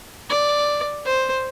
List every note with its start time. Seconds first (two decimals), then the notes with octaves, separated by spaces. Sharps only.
0.30 D5
1.06 C5